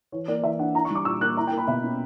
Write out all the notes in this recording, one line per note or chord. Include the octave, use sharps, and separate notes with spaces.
E3 C#5
A#3 D5
E3 E5
D4 F#5
E4 A#5
C#6
G3 D6
A#2 E6
A#3 F#6
E4 A#5
G5
A#3
B5
B2 E5
C#4